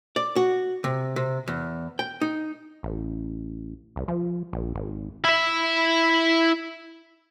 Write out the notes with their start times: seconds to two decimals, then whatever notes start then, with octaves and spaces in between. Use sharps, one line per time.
0.16 D5
0.36 F#4
0.84 C3
1.16 C3
1.48 E2
1.99 G5
2.21 D#4
2.83 A1
3.96 C2
4.08 F3
4.53 A#1
4.75 G#1
5.24 E4 E5